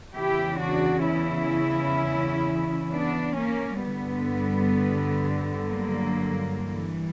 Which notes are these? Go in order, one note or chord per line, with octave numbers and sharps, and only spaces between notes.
E2 C#3 E3 E4 G4
D4 F#4
C#4 E4
B3 D4
A#3 C#4
G2 D3 G3 B3
F#3 A#3
E3 G3